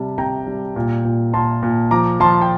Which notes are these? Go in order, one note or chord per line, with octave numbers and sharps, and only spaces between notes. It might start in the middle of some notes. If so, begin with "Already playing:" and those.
Already playing: C3 G3 A5
C3 G5 A#5
G3
A#2
A#2
A#2 A5 C6
A#2
F3 A#5 D6
F3 A5 C6
G5